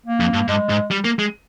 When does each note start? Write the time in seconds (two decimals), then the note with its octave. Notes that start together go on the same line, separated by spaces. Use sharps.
0.06 A#3
0.20 F2
0.34 G2
0.48 G2 G#3
0.69 G#2
0.91 G3
1.05 A#3
1.19 G#3